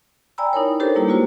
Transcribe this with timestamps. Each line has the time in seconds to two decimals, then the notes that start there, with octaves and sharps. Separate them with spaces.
0.38 D5 G5 G#5 A#5 B5 E6
0.53 D#4 E4 A#4 C#5
0.80 D4 G4 A4 A#4 C5 C#5
0.95 G3 A#3 E4 G4 B4
1.07 G#3 A#3 F4 F#4 C5